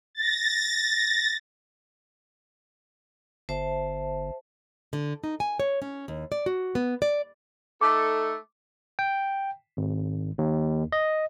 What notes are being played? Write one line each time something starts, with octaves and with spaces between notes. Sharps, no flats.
A6 A#6
G1 C5 E5 A5
D3
D#4
G#5
C#5
C#4
D#2
D5
F#4
B3
D5
A3 D#4 A4 D6
G5
G#1
D#2
D#5